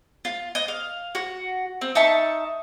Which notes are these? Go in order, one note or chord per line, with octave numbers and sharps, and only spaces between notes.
F4
D#5
F5
F#4
C4
D#4 E5 A5 C#6